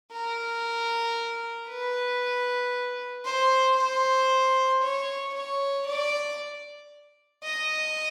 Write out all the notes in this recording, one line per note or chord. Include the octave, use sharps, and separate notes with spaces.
A#4
B4
C5
C5
C#5
C#5
D5
D#5